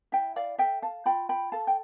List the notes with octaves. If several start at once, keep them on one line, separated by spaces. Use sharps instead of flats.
E4 E5 G5
D5 F5
A4 E5 G5
F5 A5
F4 G5 B5
G5 B5
A4 F5 A5
G5